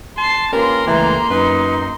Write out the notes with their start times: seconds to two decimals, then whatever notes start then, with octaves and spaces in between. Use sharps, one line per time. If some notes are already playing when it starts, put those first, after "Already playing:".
0.18 A5 C6 C7
0.53 A#3 C#4 F4 G4 A#4 B4 C6
0.87 C#2 E3 A3 G4 A#5
1.30 F#2 D#4 B4